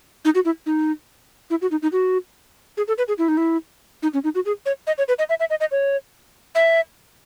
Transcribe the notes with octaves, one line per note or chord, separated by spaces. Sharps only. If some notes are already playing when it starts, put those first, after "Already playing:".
D#4
F#4
E4
D#4
E4
F#4
D#4
D#4
F#4
G#4
A4
B4
G#4
E4
D#4
E4
D#4
C#4
D#4
F#4
G#4
C#5
D#5
C#5
B4
D#5
E5
E5
D#5
D#5
C#5
E5